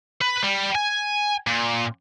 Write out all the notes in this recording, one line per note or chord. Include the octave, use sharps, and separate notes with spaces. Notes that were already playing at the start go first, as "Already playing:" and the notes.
B4
G3
G#5
A#2